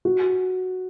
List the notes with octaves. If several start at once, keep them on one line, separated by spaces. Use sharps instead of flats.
F#4